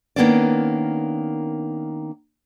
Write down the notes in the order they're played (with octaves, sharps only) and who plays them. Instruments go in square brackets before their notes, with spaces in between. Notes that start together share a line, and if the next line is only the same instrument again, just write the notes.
[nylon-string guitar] D#3 A#3 B3 C#4 D4 D5